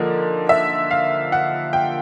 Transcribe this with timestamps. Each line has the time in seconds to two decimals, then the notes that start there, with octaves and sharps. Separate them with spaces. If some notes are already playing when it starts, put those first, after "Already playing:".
Already playing: D3 F3 A#3 D#4
0.49 E5
0.91 F5
1.32 F#5
1.73 G5